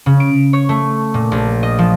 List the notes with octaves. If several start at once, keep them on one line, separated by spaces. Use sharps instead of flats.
C#3
D7
C#5
A3
A#2
A#1
D#5
F3